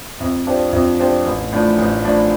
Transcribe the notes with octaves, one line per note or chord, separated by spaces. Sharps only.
F2
F3 D4 G4 C5
F2
F3 D4 G4 C5
A1
A2 F3 D4
A1
A2 F3 D4